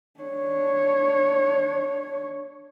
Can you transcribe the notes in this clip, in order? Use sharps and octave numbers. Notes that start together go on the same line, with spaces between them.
D4 C#5